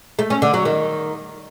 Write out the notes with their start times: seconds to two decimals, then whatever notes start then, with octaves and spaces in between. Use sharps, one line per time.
0.19 A3
0.30 C#4
0.42 D3
0.54 F#3
0.65 D#3